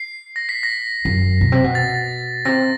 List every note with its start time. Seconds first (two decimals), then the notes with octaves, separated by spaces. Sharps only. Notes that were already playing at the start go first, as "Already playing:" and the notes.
Already playing: C7
0.36 A#6
0.49 B6
0.63 A#6
1.05 F#2
1.41 B2
1.52 C3
1.64 B2
1.75 A6
2.45 C3 A#6